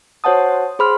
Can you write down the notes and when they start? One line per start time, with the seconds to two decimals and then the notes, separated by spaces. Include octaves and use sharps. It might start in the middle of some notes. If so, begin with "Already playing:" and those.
0.24 F#4 C5 C#5 F#5 A5 D#6
0.79 G#4 C5 B5 C6 F6